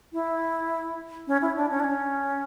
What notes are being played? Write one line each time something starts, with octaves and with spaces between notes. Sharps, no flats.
E4
C#4
E4
D4
C#4
D4
C#4